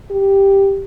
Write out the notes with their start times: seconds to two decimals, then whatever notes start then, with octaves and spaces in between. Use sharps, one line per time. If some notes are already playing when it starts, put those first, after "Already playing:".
0.11 G4